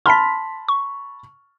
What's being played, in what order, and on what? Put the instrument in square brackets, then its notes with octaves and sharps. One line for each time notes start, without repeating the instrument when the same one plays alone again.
[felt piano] A5 B5 F6 [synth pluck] C6 B6
[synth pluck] C#6